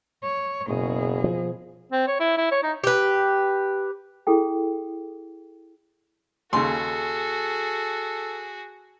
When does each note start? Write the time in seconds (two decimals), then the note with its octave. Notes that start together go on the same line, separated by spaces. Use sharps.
0.23 C#5
0.68 F#1 B2 G#4
1.24 F3
1.92 C4
2.08 C#5
2.20 E4
2.37 E4
2.52 C#5
2.63 D#4
2.84 G4 B4
4.27 E4 G#4 A4 G5
6.53 D#2 C#3 F#4 G#4 A4 C6